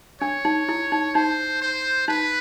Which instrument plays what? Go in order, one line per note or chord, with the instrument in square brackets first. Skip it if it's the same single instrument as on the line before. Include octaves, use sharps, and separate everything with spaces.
[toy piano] D4 [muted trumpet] C#5
[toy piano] D#4
E4
D#4
[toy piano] D#4 [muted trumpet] C5
[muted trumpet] C5
[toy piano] D#4 [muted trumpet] B4